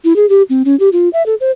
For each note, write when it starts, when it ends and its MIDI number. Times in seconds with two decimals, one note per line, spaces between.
0.04 0.16 64
0.16 0.28 68
0.29 0.42 67
0.50 0.63 60
0.65 0.78 61
0.80 0.89 67
0.93 1.09 65
1.13 1.25 76
1.26 1.35 69
1.40 1.51 72